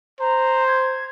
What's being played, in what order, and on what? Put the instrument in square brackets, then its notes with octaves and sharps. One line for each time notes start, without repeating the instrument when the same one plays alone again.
[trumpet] C5 [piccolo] A#5
[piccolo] G#6